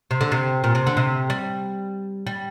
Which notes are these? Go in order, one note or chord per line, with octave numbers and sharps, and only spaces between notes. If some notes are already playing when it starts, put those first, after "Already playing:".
C3
D3
C3
A#2
C3
D3
C3
G3
G3